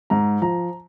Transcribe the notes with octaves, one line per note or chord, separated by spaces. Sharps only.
G#2 A#5
F3 A#5